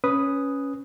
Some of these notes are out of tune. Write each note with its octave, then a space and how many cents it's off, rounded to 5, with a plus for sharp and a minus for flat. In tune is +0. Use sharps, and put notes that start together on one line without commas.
C#4 +0 B4 +0 D#6 +0